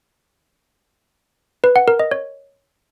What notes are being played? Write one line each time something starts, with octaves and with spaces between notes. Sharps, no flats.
B4
F#5
A#4
D#5
C#5